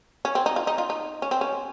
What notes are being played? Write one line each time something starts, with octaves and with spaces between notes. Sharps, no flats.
C#4
C4
D#4
F4
D#4
F4
D#4
C#4
C4
C#4